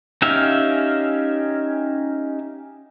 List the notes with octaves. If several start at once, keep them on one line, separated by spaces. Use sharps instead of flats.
C#4 D#4 G4 E5 F5